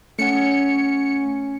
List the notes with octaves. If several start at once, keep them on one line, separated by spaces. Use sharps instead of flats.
A3 C#4 F#5 C#7